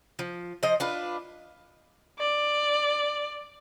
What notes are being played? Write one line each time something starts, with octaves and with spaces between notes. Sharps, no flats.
F3
F3 C5 D#5
D4 F4 B4
D5